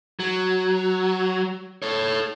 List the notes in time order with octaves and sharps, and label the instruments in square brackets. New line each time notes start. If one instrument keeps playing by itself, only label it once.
[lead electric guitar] F#3
A4 C#5